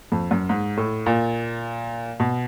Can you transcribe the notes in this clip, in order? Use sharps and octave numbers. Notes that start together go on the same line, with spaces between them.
F2
F#2
G#2
A2
A#2
B2